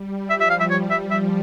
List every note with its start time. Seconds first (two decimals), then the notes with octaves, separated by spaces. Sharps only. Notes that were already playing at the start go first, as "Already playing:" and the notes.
Already playing: G3
0.29 F3 E5
0.41 E5
0.50 F5
0.60 E5
0.70 G3 C#5
0.91 E5
1.11 F3 E5